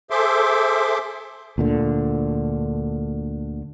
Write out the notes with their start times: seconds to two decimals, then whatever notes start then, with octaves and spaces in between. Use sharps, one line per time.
0.10 G#4 A4 C5 E5 C6 D6
1.58 D2 A#2 D3